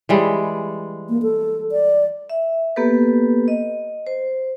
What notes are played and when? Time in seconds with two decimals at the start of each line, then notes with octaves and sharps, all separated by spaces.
0.09 E3 G3 G#3
1.09 A#3
1.22 A4
1.72 D5
2.30 E5
2.76 A#3 B3 G4 A4 B4
3.48 D#5
4.07 C5